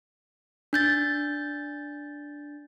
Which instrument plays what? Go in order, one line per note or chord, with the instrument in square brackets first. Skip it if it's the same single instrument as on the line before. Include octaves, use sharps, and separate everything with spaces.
[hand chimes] D4 G6 A6